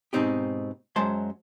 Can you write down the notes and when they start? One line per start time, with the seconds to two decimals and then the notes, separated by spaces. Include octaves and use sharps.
0.13 G#2 B2 C4 D#4 G4
0.96 F#2 F#3 G#3 C5 A5 C6